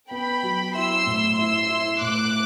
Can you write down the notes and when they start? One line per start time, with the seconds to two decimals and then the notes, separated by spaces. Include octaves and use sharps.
0.11 B3 G5 B5
0.43 F#3
0.74 E4 C6 E6
1.06 A2
1.37 E4 C6 E6
1.69 E4
2.00 A2 D6 F#6